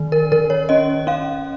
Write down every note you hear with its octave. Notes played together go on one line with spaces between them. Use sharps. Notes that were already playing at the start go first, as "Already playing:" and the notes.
Already playing: D#3
A#4
D#3 A#4
C#5
C#4 D#5
C#4 F5